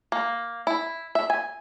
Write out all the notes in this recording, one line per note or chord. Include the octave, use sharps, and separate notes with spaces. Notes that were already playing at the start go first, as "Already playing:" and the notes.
A#3
E4
E5
G#5